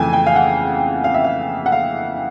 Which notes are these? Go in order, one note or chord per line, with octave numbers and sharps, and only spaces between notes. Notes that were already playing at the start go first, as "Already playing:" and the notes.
Already playing: F2 C#3 E3 A3 G5 G#5
G5
F5
F#5
F5
E5
F5
F#5
F5